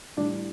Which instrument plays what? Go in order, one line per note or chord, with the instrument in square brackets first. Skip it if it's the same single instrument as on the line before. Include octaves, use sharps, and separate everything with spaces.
[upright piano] A2 E3 G3 D4